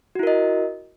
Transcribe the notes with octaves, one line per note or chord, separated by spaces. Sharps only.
E4 F#4 A#4 D#5